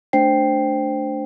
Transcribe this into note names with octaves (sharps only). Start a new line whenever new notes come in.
A3 D4 C5 G5 C7